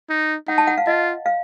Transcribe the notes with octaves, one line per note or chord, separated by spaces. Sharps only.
D#4
D#4 F#5
A5
F#5
F5
F4 D#5
F5